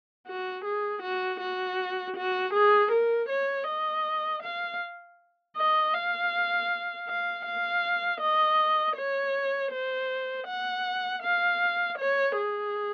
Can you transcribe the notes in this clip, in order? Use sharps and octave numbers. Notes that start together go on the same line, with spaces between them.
F#4
G#4
F#4
F#4
F#4
G#4
A#4
C#5
D#5
F5
D#5
F5
F5
F5
D#5
C#5
C5
F#5
F5
C#5
G#4